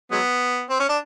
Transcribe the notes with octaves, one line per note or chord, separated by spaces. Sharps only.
F#3 G#3 B3
C4
C#4
D4